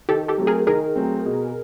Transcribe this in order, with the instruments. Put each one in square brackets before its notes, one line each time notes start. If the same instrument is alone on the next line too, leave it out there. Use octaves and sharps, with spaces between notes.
[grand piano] D#3 [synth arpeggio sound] G4 A4
[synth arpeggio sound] G4 A4
[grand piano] F#3 A3 C4
[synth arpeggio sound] G#4 A#4
[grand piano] D#3 [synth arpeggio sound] G#4 A#4
[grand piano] F#3 A3 C4
B2